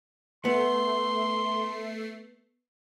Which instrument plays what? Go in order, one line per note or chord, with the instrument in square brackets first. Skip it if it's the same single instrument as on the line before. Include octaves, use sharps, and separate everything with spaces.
[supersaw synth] A3 C7 [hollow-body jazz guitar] B3 [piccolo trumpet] C6